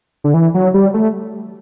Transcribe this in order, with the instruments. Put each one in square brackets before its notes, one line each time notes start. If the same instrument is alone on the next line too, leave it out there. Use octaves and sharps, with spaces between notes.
[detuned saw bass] D3
E3
F#3
G3
A3